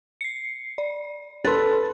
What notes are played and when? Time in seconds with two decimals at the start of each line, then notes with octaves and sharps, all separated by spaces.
0.21 C7 C#7
0.78 D5
1.45 A4 B4 C6 A6